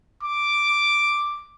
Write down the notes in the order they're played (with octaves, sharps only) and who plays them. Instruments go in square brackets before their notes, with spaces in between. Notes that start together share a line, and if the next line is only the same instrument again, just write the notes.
[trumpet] D6